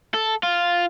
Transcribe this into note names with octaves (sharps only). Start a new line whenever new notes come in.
A4
F4